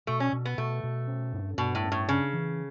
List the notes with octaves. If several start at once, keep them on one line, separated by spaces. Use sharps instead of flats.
B2 A3
C#4
B2
B3
B2 A3
B2
C#4
G2
G2 B2
A2
C#4
A2
C#3 D4
E3